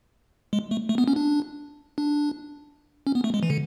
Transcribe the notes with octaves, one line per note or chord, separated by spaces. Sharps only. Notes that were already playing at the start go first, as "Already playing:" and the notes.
G#3
A3
A3
B3
C#4
D4
D4
C#4
B3
A3
G#3
E3
D3